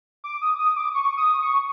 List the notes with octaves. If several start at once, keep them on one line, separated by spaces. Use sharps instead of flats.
D6
D#6
D#6
D6
C#6
D#6
C#6